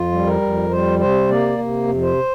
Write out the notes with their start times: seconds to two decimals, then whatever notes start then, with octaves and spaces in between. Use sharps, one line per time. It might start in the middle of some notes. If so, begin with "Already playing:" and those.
Already playing: F2 F4
0.12 G3
0.26 A#4
0.41 F2
0.70 G3 C5
0.99 C3 C5
1.29 A#3 D5
1.58 C3
1.87 F2
2.02 C5